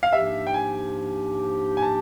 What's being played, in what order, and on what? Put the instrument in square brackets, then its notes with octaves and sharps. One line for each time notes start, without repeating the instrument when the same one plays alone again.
[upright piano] F5
[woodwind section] G#2 F3 A#3 D4 G4 [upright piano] E5
[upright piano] G5
G#5
G#5
A5